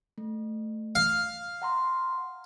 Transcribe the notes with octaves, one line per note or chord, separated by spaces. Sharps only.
A3
F5
F#5 A#5 C6